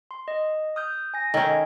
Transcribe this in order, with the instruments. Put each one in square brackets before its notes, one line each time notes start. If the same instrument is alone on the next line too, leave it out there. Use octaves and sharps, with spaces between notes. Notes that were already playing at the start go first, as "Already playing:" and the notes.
[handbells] C6
D#5
D#6 F6 G6
G#5 A#6
[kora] D#3 C#4 [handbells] A4 C#5 D#5